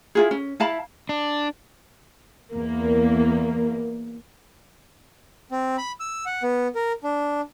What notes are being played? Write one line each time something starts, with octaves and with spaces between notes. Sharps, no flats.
E4 F4 G#4
C#4
E4 F5 A5 B5
D4
E2 A#3
C4
B5
E6
F#5
B3
A#4
D4